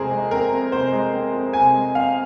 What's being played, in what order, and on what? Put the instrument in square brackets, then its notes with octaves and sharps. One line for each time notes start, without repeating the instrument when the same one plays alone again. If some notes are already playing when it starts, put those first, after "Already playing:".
Already playing: [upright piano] F2 C3 G#3 C4 G#4 A#4 C5
G#3
C4 A#4
F2
C3 C5
G#3
C4
F2
C3 G#5
G#3
C4 F5